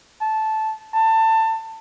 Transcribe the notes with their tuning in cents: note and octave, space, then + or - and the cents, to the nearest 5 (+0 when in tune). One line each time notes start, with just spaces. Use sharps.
A5 -10
A5 +25